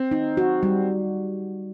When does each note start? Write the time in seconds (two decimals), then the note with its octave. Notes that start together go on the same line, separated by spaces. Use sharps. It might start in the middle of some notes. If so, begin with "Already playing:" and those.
Already playing: C4
0.11 D#4
0.37 F#4
0.63 G3